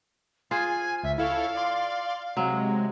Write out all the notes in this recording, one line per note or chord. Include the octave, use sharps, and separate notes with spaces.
F4 G#4 C5 G#5
C#2 E5
E4 A4 C#5 F5
D5 C6
C3 F#3 G#3